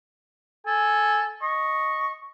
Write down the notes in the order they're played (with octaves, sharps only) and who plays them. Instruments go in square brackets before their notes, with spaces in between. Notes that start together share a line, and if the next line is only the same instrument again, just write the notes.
[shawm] A4 [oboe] G#5
[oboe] D#5 [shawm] C#6